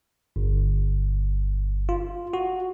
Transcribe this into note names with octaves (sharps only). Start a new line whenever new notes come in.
G1
F4
F#4